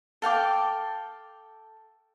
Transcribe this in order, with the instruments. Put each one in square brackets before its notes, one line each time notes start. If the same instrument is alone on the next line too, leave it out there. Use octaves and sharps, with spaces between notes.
[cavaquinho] A4 F5 G5 D6